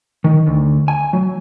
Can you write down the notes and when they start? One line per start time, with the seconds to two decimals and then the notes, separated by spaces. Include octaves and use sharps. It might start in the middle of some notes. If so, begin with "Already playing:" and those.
0.24 D#3
0.47 D2
0.88 G#5
1.13 F#3